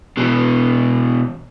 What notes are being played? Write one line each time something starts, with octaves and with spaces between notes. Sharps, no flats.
B2 E3